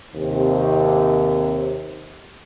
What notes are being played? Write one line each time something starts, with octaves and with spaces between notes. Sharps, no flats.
D#2 C3